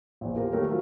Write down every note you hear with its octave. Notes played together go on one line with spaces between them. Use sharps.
A#1 E2
A#3 F4 G4 A#4 C5
D#3 G3 A3 A#3 A#4 C#5
F3 F#3 F4 F#4 A#4